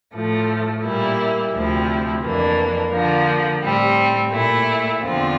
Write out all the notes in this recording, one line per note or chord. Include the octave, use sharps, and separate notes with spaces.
A2 F3 A3
A#2 G3 A#3 E4
D2 C3 F3 C4 E4
F2 E3 A#3 D4
D3 F3 A#3
A2 G3 C4
A#2 A3 E4
E2 D3 F3 C4 F4